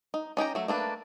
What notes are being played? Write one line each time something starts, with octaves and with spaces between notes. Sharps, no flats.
D#4
C#4 D#4 G4 A#5
F#3 A3
A3 A#3 D4 B4